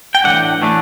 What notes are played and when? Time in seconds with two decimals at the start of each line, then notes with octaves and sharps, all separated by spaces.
0.15 G5
0.24 A2 E3 A3 D4 F#5
0.62 A2 E3 A3 D4